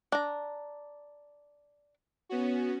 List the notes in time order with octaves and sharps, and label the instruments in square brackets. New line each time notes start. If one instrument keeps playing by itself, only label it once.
[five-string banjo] D4 A#5
[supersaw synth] B3 C#4 F#4